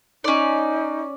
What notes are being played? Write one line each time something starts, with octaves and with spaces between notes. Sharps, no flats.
C#4 D#4 D5